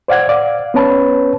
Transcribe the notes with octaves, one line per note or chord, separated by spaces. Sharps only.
C5 D5 F5 F#5 G#6
D5 F5
B3 C#4 B4 C#5 A5 B5